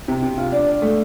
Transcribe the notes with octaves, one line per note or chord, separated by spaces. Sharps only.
C3
C3
F4
D4
D4
A3